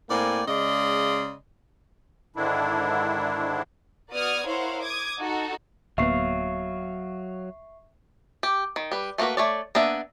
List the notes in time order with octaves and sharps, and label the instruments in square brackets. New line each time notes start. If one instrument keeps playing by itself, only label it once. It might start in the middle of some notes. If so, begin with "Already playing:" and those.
[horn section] A2 A#3 C4 D5 G5 G#5
C#3 G#3 D5 D#5 F5 C6
[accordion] G#2 D3 D#3 D4 E4
[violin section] B3 F#4 D5 D#6 F6 G#6
E4 A#4 C5 C#5 F5 F#5
D6 D#6 G#6
D#4 F#4 A4
[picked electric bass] D1 A#3 B3 [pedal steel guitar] F#3 F5 [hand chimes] E5 C#6 C7
[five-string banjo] G4
D#3
G3 B4
A3 A#3 D4 F#4 B4
A3 C#5 D5
A#3 B3 D4 E5